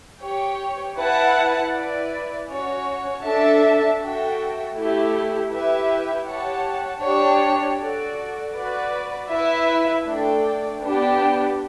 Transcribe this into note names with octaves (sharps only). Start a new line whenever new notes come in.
G4 C#5 G5
E4 B4 F#5 A5
E4 B4 D5
C#4 F#4 C#5
D4 A4 E5 A5
F#4 A4 E5 G5
A3 E4 G4
E4 G4 B4 E5
G4 C#5 F#5 A5
D4 G4 C#5
F#4 A4 D5
F#4 B4 D5
E4 B4 E5
A3 D4 A4 D5 G5
B3 D4 G4